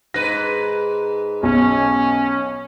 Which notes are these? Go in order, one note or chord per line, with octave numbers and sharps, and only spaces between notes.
G#2 B4 A#6
B1 C#4